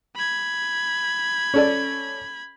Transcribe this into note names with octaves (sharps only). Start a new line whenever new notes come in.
B5 G#6
C#4 A4 D5